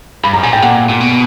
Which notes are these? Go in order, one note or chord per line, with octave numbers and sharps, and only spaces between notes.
G2 B5
F#2 A#5
A#2 G#5
A2 G5
A#2 F#5
A#2
B2